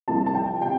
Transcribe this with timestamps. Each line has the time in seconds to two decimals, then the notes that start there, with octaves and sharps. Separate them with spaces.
0.08 C2 C3 F3 A5
0.26 A5
0.35 G5
0.61 C3 F3 G5